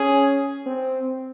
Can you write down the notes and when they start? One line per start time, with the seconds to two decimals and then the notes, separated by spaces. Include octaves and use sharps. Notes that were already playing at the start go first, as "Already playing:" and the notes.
Already playing: C#4 G#4
0.67 C4